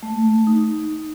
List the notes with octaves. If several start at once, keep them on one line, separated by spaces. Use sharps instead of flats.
A3
D#4